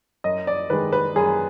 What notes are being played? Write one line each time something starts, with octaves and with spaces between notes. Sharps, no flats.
F#2 D#5
D5
D#3 G#3 B4
B4
F#2 G#4